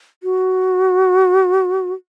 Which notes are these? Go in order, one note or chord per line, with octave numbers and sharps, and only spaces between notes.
F#4